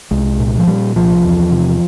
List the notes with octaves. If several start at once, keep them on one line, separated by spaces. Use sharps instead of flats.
C2 G#3
A#2
F3
A#2 G3
C2 F3
E2
C3